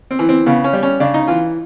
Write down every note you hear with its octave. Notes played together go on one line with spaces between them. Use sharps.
C4
E3
C4
C#3 B3
C#4
G3
C#4
C#3 D4
D#4
E3 F4